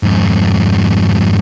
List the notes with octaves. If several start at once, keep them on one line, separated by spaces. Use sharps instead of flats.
F2 G#2